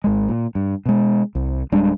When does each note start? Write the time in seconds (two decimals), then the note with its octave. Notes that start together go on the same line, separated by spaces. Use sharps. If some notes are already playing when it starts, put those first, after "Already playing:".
0.04 G#1 G#3
0.29 A#2
0.55 G2
0.86 B2 G#3
1.35 C2
1.72 D1 G3 G#3 D4